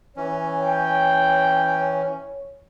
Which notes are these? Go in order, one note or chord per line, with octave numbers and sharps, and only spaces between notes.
E3 C#4 C#5
G5